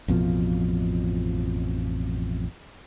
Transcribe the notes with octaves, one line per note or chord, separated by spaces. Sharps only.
A1 F2 B2 F3